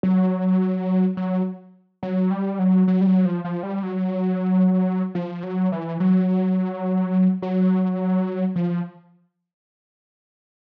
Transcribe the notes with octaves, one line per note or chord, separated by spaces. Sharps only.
F#3
F#3
F#3
G3
F#3
F#3
G3
F#3
F3
F3
G3
F#3
F3
F#3
E3
F#3
F#3
F3